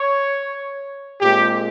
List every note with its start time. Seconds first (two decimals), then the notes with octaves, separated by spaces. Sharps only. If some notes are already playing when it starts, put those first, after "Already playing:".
Already playing: C#5
1.21 A#2 G#3 C4 G4